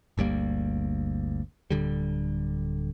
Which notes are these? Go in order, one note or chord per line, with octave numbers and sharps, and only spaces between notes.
G1 D2 G3 A#3
D1 D3 G3